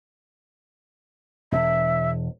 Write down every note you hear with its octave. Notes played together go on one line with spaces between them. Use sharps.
E1 E5